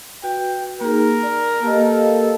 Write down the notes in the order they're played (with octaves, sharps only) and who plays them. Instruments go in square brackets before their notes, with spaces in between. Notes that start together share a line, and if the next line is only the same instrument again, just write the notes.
[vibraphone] F#4 B4 [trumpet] G5
[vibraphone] A#3 D#4 G#4 [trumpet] A#4
[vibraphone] D5
[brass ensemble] A#3 A4 [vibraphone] G4 D#5